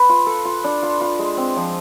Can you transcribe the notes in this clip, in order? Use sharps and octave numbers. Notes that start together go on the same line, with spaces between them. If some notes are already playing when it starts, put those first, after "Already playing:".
Already playing: B4
F4
A4
F4
D4
F4
F4
G#3
C4
F3